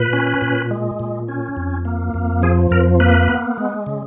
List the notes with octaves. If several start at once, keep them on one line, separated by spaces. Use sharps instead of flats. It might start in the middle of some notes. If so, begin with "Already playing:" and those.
Already playing: A#2 B4
C#4
A#2
G#3
A#2
C#4
F2
A#3
F2
F3 G#4
F2 A#4
A#3 B4
B3
G#3
C#3